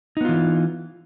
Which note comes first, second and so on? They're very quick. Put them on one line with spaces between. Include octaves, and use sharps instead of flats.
D#4 B3 F4 E3